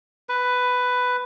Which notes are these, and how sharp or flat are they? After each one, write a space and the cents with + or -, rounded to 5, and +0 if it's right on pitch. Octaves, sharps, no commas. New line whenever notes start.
B4 +10